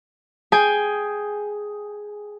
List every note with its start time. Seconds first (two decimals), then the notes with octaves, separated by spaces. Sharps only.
0.52 G#4 G5 G#5